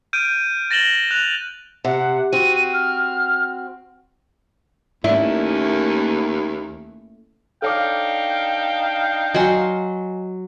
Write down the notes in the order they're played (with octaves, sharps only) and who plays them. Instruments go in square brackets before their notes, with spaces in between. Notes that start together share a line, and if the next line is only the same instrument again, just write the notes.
[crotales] F6 G6 D7 D#7
A6 A#6 E7 F#7 G7
F#6 F7
[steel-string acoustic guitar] C3 [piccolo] F#5
[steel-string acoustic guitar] C4 F#4 [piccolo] D#7
[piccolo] F6
[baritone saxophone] D#2 [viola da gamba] A3 A#3 C#4 [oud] E4
[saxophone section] D4 D#4 F5 [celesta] A4 C#5 D6 [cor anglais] G5
[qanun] F#3 C6 [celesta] D#5 G#5